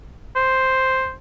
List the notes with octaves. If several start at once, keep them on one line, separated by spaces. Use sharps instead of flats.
C5